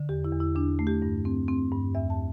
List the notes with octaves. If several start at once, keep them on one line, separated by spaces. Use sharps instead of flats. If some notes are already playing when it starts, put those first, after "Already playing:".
Already playing: D3
E2 G4
E4
E2
E4
E2 D4
A3
G4
G2
C4
C4
G2
E2 E5
A5